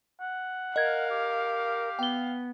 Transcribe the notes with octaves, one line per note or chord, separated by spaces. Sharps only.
F#5
A#4 D#5 F5 G#6
G4
B3 G5 G7